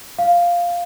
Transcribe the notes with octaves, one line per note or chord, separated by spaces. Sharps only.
F5